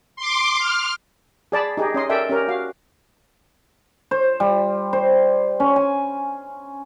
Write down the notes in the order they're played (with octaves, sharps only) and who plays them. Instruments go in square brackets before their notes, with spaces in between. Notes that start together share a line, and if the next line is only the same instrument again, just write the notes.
[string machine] C6 D6
F6
[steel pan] G#4 D5 A5 B5
D#4 G4 G#4
C#4 D#5 C6
A4 A#4 D5 E5 G5
C#4 G4 A#4
F#4 F5
[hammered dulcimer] C5
G3
C5
C#4
G#5